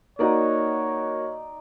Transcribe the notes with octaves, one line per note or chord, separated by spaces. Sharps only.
A#3 D#4 F#4 C#5 D5 D#6